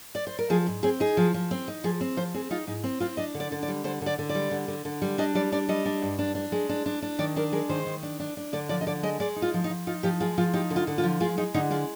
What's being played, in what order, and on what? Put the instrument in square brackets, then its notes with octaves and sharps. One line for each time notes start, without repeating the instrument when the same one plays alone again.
[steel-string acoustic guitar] D5
C5
A#4
F3 G#4
G#2
C4 G#4
D#4 G#4
F3
F3
C4
D#4
F3 G#4
C4
F3 C5
C4 G#4
D#4 F4
G#2 D#4
C4
C4 F4
D4 D#5
D3
D5
D3
D5
G3
D3 C5
D3 D5
D3
D5
G3
D3
D3
D3
G3
D4 D#5
G3 D5
D4 D5
G3 D#5
D4
G2
D4
D4
G#3
D4
D4
D4
D#3 D5
D4 A#4
G#3 A#4
D#3 C5
D#3
D4
D4
D4
D3 D5
F3 D5
D#5
D3 D5
G#3 D#5
G#3 D5
D#4
F4
F3
D#4
F3
D#4 F4
F3 G4
G#3 F4
F3 F4
D#4 G4
D3
F4
D3
F4
F3
G#3 F4
G#3 D#4
D3 D#4
G#3 F4